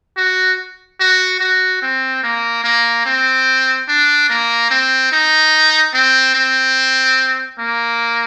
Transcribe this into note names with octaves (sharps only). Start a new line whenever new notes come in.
F#4
F#4
F#4
C4
A#3
A#3
C4
D4
A#3
C4
D#4
C4
C4
A#3